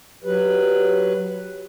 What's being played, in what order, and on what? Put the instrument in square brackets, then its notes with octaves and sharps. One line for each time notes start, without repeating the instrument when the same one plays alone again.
[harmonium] F#3 B4 [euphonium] G4